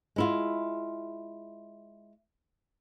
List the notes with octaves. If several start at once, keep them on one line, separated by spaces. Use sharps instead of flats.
G#3 E4 F4